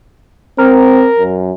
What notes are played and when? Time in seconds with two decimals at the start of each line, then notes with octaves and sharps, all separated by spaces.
0.58 C4 A#4
1.19 F#2